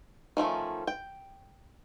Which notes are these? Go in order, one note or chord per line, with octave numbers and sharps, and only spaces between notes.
D#3 F3 A3 C#4
G5